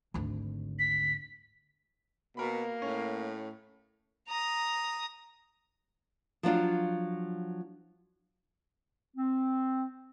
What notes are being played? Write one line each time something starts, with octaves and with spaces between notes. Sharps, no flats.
G#1 D2
B6
B2 A#3 A#4 B5
A2 C#4
A#5 D#6
F3 F#3 D4 F4
C4